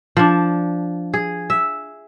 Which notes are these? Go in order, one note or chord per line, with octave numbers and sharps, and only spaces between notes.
F3 D4
G#4
E5